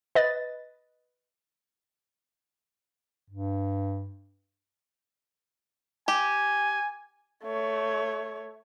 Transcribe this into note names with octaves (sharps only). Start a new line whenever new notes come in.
B4 D#5 A6
G2
G4 G#5
A3 C#5